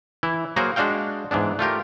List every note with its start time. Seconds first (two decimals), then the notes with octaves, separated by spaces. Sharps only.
0.23 E3 E4
0.56 F#3 A#3 F#4 G#4 A#4 C5
0.76 G#3 D4 F#4 F5 G5
1.31 G#2 E3 B3 D4
1.59 A3 F4 G4 A#4